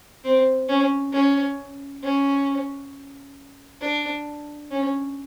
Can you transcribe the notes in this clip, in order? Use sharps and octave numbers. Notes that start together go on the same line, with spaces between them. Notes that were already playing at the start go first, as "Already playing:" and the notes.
C4
C#4
C#4
C#4
D4
C#4